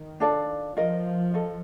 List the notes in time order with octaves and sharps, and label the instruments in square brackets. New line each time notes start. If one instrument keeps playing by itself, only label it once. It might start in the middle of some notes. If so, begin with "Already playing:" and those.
Already playing: [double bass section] D#3
[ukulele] D4 F4 A4 D5
[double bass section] F3 [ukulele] F4 A#4 D#5
[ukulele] F4 A4 D#5